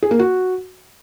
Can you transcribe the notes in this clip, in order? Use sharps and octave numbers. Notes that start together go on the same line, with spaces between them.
G#4
A#3
F#4